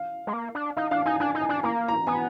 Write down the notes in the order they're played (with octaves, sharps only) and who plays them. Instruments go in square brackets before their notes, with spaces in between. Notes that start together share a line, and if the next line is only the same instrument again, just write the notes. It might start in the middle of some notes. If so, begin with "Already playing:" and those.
Already playing: [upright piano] F5
[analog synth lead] G#3
A#3
D4
[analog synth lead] D#4 [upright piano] F5
[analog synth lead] D4 [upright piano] F5
[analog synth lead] D#4 [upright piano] G#5
[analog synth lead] D4 [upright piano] G#5
[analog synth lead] D#4
[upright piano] G#5
[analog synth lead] D4
[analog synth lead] A#3 [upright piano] A#5
[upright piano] A#5
[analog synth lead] B3 [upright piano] G#5